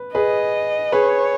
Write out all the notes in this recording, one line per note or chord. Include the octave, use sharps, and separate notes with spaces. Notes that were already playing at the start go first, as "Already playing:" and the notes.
Already playing: B4
G#4 B4 D#5
G#4 B4 C#5